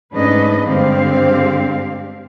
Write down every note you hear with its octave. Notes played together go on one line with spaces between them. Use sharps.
G#2 A3 C#4 D4 B4 D#5
G2 D3 G#3 C4 G4 F5